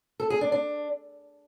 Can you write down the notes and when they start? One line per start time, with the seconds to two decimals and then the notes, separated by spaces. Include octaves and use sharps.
0.20 A4
0.30 G#4
0.41 D4
0.52 D4